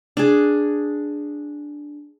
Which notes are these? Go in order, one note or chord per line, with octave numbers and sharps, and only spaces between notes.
D4 G#4